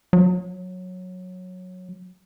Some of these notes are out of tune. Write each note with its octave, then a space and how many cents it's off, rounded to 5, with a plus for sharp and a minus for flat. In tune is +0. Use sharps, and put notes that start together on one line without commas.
F#3 -15